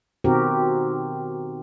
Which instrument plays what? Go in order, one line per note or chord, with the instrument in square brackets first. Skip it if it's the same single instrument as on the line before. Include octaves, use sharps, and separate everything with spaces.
[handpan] B2 D#3 C4 F#4 G4 A#4